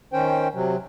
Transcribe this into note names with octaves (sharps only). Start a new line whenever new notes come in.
D#3 C#4 C5 G5
C3 F#3